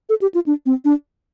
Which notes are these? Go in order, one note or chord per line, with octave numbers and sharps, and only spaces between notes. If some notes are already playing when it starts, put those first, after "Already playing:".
A4
G4
F4
D4
C4
D4